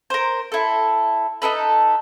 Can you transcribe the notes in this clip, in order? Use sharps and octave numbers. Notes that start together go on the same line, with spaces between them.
A#4 C5
E4 A4
D#4 E4 A4 B4